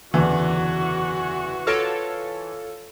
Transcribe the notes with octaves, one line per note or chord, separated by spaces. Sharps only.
F#1 E2 D3 E3 F#4
F4 A4 C#5 F6 A#6 D7